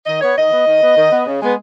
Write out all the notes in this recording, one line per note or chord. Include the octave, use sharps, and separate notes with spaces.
D#3 D#5
B3 C#5
D#3 D#5
B3
D#3
B3
D#3
B3
C#3
G#3 B3